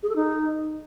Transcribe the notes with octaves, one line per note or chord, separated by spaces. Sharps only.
G#4
A4
D#4